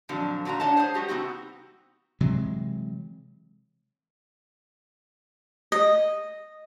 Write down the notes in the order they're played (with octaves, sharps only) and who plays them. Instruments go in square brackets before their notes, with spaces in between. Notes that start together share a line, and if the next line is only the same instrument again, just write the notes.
[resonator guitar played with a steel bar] F2 A#2 D3 F#3
A#2 D3 F#4 A#4 A#5
A2 D4 C#5 D#5 F#5 A5
G#4 C5
G3 G#3 F#4 G4
C3 B3 C4 D#4 F#4
[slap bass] C3 E3 F#3 G#3
[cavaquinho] D#5